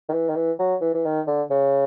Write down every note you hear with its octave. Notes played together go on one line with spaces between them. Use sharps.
D#3
E3
D#3
E3
F#3
E3
E3
D#3
D3
C#3